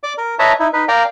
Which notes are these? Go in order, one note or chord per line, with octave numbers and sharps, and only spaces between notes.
D5 D6
A#4
B4 C#5 D#5 E5 A5 A#5
D#4 E4
D#4 B4
A#4 D5 F5 G5 A#5